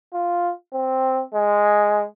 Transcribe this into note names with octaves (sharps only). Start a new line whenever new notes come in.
F4
C4
G#3